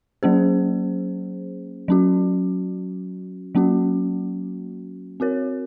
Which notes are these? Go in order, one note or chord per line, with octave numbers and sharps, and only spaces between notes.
F#3 A#3 C#4 G#4 C5
F#3 C#4 F#4
F#3 A#3 C#4 F#4
C4 F#4 A#4 C#5